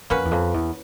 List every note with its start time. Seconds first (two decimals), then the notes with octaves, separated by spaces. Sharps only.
0.10 F2 A#3 C#4 F#4 B4
0.25 E2
0.31 F2
0.54 E2